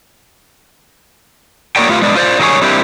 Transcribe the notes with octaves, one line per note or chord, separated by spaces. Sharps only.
A#3 F#4 A#4 C#5 D5 G5
A3 F4 G4 B4 F5
G#3 B3 D4 D5
F4 C5 D5
D#3 F#3 G3 A3 G#4 C#5
G3 A#3 C4 D4 E4 G4